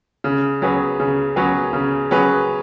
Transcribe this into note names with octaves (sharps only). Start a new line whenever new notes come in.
C#3
F#3 C#4 G#4 B4
C#3
F#3 C#4 G#4 B4
C#3
F#3 C#4 G#4 B4